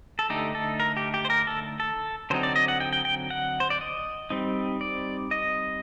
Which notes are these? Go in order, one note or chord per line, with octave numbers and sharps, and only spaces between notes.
A4
D3 A3 D#4 G4
A4
A#4
G4
G4
C5
A#4
A4
A4
D3 F#3 C4 D#4 C5
D5
D#5
F#5
G5
G5
G5
F#5
C5
D5
D#5
G3 C4 D#4
D5
D#5